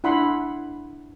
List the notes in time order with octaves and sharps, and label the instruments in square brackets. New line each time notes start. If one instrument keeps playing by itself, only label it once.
[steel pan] D4 E4 F#5 B5 C6